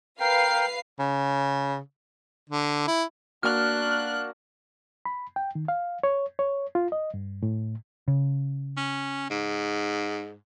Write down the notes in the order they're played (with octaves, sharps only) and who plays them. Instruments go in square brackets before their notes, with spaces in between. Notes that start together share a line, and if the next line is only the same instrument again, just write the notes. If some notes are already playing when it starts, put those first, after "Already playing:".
[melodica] A#4 G5 [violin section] B4 F5 C7
[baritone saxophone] C#3
[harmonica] D3
E4
[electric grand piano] A#3 F#4 [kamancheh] D4 F#6 [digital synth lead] F6
[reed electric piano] B5
G5
D#3
F5
C#5
C#5
F4
D#5
G2
A2
[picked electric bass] C#3
[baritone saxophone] C#4
G#2